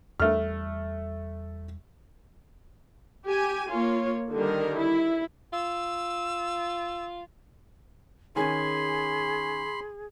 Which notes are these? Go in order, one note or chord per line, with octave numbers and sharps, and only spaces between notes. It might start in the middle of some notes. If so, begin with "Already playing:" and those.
E2 G3 A3 F6
G4 G#5
A#3 F4 C#5
D3 D#3 G3 A#4
E4
F4 E6
D#3 C#4 G#4 G#5 B5 C6